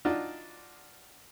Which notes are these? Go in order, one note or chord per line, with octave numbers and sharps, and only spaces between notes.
D4 D#4 F4 F#4